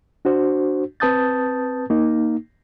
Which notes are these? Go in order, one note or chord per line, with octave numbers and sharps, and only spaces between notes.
D4 F#4 C5
C4 B4 A5 D#6 G6 A6
A#3 D#4